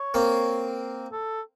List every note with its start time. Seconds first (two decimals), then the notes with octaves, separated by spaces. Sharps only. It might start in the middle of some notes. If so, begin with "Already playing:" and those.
Already playing: C#5
0.14 A#3 C4
1.12 A4